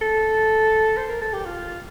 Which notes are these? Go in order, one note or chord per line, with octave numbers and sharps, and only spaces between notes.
A4
C5
A#4
A4
G4
F4